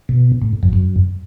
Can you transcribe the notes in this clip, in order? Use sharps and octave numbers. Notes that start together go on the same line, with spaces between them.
B2
A2
F#2
F#2